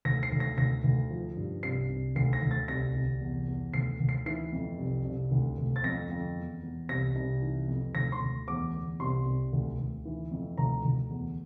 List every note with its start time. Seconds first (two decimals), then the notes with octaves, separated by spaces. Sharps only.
0.05 D2 A#6
0.23 C7
0.32 D2
0.40 A#6
0.58 D2 A#6
0.84 D2
1.11 F3
1.37 G2
1.63 C2 C7
1.90 C2
2.16 D2 C7
2.33 A#6
2.42 D2
2.51 A6
2.68 C2 A#6
2.95 C2
3.21 E2
3.48 E2
3.74 D2 C7
4.00 D2
4.09 C7
4.26 E3 C7
4.52 F2
4.78 C2
5.05 C2
5.31 D2
5.58 D2
5.76 A6
5.84 F2 A#6
6.10 F2
6.37 E2
6.63 E2
6.89 C2 A#6
7.16 C2
7.42 E3
7.68 F2
7.95 D2 A#6
8.12 C6
8.21 D2
8.47 E2 D6
8.74 E2
9.00 C2 C6
9.26 C2
9.53 D2
9.79 D2
10.05 E3
10.31 F2
10.58 D2 A#5
10.84 D2
11.10 E2